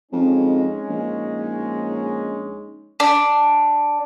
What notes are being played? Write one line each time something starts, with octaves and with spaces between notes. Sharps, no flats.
F2 G#3 C#4 D#4
A#1
D4